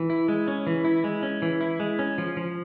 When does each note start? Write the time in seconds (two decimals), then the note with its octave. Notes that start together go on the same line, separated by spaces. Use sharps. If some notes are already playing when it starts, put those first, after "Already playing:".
Already playing: E3
0.10 E4
0.28 G#3
0.48 C#4
0.67 E3
0.85 E4
1.04 G#3
1.23 C#4
1.42 E3
1.61 E4
1.80 G#3
1.99 C#4
2.18 F3
2.37 F3